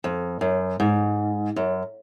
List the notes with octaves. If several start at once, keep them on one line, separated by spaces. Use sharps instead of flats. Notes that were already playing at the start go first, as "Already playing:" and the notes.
F2
F#2
G#2
F#2